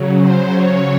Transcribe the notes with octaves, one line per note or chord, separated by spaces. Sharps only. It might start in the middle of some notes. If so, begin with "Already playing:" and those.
Already playing: C#3 F#3
C5
C#5